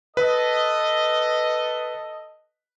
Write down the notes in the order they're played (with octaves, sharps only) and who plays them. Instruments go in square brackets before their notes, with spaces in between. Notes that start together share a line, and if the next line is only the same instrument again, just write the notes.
[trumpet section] A4 D#5 [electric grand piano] B4